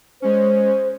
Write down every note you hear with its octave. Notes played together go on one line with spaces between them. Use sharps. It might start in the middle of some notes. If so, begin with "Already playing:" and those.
G#3 C#4 C5